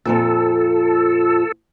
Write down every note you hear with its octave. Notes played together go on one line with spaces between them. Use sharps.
F2 A#2 F3 A4